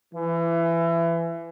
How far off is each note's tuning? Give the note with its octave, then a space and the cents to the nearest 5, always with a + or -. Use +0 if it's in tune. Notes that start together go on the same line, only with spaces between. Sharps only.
E3 +25